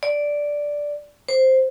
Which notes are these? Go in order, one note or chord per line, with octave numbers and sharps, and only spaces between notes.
D5
C5